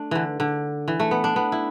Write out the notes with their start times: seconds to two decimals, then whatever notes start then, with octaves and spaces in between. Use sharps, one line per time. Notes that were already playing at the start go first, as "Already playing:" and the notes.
Already playing: A3 D4
0.11 D3 E3
0.40 D3
0.88 E3
1.00 A3
1.11 B3
1.24 D4
1.36 B3
1.52 E4